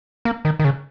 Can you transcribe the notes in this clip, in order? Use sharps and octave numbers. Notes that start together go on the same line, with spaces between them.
A#3
D#3
D#3
C#3